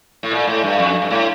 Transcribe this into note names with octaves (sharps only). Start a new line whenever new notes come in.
A2
A#2
A2
G2
F2
G2
A2